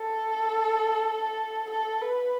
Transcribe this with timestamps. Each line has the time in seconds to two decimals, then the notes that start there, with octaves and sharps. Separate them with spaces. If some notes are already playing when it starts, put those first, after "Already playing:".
Already playing: A4
1.70 A4
2.01 B4